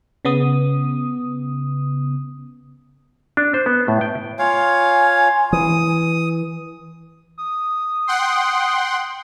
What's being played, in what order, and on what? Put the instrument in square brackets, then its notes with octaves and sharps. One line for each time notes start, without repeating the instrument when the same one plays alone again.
[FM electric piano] C#3 B3 D#6
[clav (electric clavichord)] D4
C5
B3
A2
G5
[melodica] F4 C#5 F5 [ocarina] G#5
[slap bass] E3 [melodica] D#6
[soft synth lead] D#6
[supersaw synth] F#5 G5 C6